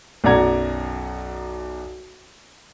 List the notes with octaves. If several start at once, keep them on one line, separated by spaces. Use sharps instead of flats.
B1 F#2 D5 F#5 A#5 G#6